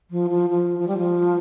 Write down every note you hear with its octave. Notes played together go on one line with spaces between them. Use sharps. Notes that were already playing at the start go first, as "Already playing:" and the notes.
F3
F3
F3
F3
G3
F3